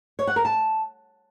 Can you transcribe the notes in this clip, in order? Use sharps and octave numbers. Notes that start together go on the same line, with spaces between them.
C#5
F#5
A#4
A5